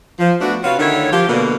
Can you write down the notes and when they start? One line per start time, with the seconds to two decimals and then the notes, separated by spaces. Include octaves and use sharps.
0.19 F3
0.41 A3 B3 D4 F#4
0.64 C3 F4 F#4 B4 C#5 F5
0.79 D3 D#3 A3 E4 C#5
1.12 F3 G4
1.28 B2 D3 A#3